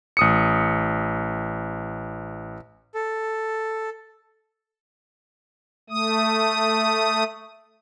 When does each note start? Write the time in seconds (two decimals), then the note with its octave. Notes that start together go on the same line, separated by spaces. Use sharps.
0.17 A1 D#6 C#7
2.94 A4
5.90 A3 D#6